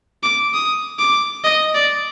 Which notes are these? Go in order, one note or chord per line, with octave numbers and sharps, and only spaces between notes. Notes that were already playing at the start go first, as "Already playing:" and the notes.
D6
D#6
D6
D#5
D5